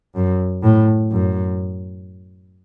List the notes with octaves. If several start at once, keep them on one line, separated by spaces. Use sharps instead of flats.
F#2
A2
F#2